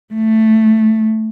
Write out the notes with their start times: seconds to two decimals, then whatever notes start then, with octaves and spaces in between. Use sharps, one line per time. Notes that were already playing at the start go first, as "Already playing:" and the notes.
0.14 A3